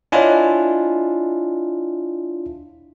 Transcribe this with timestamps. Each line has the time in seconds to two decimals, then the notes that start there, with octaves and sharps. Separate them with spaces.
0.12 D4 E4 F4 C#5 D#5 G#5